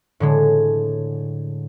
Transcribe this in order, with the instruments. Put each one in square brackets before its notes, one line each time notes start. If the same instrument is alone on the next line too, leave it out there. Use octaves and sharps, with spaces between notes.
[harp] A2 D3 G#3